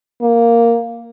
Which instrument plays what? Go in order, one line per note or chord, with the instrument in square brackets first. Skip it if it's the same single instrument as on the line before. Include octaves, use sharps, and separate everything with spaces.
[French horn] A#3